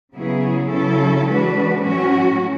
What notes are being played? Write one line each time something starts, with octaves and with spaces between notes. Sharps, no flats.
C#3 F#3 B3 E4 G#4
C#3 F#3 C#4 E4 A4
E3 G#3 D4 F#4 B4
A2 F#3 A3 C#4 F#4